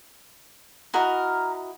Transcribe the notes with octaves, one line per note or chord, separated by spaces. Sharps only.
E4 F#4 A#4 D#5